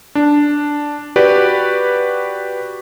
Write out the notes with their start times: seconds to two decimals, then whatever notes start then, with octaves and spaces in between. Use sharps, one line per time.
0.15 D4
1.16 F#4 G4 B4 D5